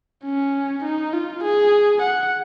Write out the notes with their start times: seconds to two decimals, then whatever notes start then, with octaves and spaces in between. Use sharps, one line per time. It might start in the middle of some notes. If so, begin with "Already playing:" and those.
0.25 C#4
0.84 D#4
1.13 F4
1.44 G#4
2.02 F#5